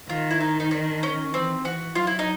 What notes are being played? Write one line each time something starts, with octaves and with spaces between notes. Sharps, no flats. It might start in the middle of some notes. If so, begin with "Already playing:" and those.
D#3 F4
E4
D#4
D#4
D4
C#4
E3 C4
E3 F#4
F#3 F4
E4
D#4